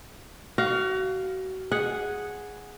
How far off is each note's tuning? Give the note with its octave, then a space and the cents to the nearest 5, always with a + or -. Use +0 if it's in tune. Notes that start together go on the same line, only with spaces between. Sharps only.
F#4 +30 F5 +0
G#4 +0 F#5 -5